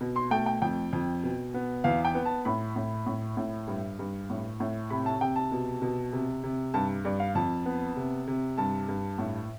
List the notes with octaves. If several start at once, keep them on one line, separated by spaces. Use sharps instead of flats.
B2
C6
A3 G5
G5
F2 G5
F2
B2
B3
E2 F5
G5
B3
A5
A2 B5
A2
A2
A2
G2
G2
A2
A2
C3 B5
A5
C3 G5
A5
B2
B2
C3
C3
G2 A5
G2 D5
F5
F2 A5
B3
C3
C3
G2 A5
G2
A2